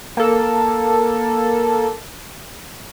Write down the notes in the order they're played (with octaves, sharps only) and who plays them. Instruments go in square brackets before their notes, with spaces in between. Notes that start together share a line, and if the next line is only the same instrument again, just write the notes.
[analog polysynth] A#3 A4